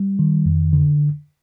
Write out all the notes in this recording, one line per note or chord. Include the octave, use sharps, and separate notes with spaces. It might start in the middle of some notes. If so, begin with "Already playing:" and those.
Already playing: G3
D#3
F2
D3